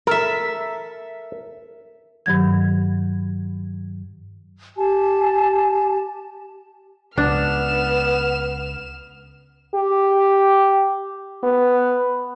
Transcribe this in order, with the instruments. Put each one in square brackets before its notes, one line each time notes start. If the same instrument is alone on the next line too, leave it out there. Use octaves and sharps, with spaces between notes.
[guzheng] A4 E5 [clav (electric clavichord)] A#4
[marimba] G2 D#3 F#3 G#6
[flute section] G4 G#5 A5
[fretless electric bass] C#2 [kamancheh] B3 [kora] D4 [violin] F6 E7
[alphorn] G4
B3